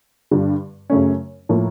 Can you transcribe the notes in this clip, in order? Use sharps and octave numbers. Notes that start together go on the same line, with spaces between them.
G2 D3 G3
F#2 C#3 F#3 A3 C#4
A2 F3 A#3